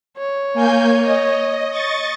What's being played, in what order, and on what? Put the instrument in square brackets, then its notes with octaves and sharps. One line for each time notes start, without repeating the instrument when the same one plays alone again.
[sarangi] C#5
[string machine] A#3 G#5 G6
D#5
D#5 C#6 A6